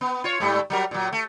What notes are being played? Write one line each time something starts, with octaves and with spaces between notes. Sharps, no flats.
B3
F4 C#5
G#2 G3 A3
F#3 G3 A#4
A#2 F#3
A3